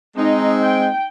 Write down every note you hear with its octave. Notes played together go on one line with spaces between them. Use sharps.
G#3 C4 D#4
G5